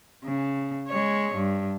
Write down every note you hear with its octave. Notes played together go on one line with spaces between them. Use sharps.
C#3
G#3 C#5
G2